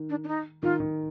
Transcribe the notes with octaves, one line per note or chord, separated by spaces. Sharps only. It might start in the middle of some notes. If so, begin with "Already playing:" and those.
Already playing: D#3
D4
D4
D#4
D#3 F4
D#3